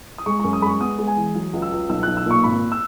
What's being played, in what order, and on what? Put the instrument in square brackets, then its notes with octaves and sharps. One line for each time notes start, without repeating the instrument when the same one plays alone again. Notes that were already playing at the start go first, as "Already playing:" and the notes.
[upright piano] D#6
G#3 C#6
F#2 C#6
D#6
G#3 B5
C#6
B3 D#6
G#3
G#5
E3
F#3
C#2
E6
C#2
B1 E6
B1 F#6
E6
A#2 C#6
G#1 B5
E6